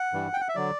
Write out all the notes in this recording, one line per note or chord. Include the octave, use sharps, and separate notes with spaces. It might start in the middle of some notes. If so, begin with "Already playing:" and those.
Already playing: F#5
G2 E3 G3
G5
F#5
E5
D3 F#3 D5